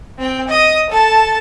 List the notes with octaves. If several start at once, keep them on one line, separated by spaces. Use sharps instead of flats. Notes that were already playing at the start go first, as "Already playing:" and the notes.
C4 G5
D#5 D#6
A4 A5